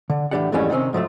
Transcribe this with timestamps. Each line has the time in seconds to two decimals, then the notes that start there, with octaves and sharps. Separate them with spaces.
0.10 D3
0.31 A2 E3 D4 G4 D5 F#5
0.52 F2 G#2 E3 G3 A3 C#4
0.70 C3 D#3 G3 C4 C#4
0.93 G#2 F3 F#3 A3